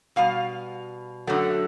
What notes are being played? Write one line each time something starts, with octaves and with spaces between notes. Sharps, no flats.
B2 G3 F5
F#2 D3 F#3 A3